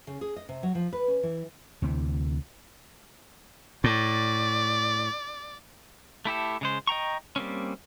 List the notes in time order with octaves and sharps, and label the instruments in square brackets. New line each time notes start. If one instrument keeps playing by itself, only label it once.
[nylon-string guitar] C#3
G#4
D#5
C3
F#3
F3
B4
C#4
E3
[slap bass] D2 C3 E3
[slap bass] A2 [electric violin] D5
[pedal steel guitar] A3 E4 G4 A4
C#3 G#3 C5
D#5 G5 A#5 C#6
G3 A#3 C4 C#4